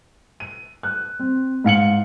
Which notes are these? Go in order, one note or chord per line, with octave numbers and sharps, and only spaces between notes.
D#7
F#6
C4
G#2 F5 C#7 F#7